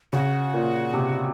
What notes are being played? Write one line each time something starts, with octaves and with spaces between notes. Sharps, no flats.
C#3 F#4
A#2
C3